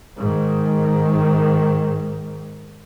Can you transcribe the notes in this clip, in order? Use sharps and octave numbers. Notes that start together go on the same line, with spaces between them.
G#2 D#3